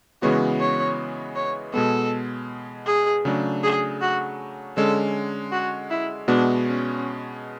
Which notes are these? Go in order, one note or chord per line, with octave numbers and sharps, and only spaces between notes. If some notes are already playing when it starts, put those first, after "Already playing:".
C#3 E3 G#3 B3 F#4 C#5
C#5
C#5
B2 G#3 B3 A4
G#4
C#3 F#3 A3 D4
G#4
F#4
D3 G#3 C#4 A4
F#4
E4
B2 G#3 B3 D4 F#4
C#4